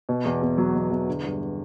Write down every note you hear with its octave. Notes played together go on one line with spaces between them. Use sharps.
B2
E2
E2
F#3
B2
E2
D3
G2